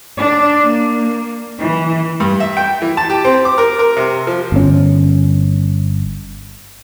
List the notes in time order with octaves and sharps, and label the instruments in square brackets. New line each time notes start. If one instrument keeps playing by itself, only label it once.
[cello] D4
A#3
E3
[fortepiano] G2
E5
G5
E3
A5
G4
C4
D6
A#4
A#4
C3
F3
[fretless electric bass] G1 C#4